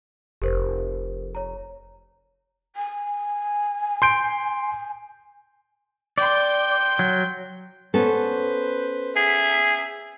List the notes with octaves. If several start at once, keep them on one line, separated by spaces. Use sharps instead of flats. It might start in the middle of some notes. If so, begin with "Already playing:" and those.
F1 G4 A#4 C5
C#5 A#5
G#5
C6 G6 D7
D5 G5 C6
F#3
B3 C#4 A4 B4 C5
G#4 E5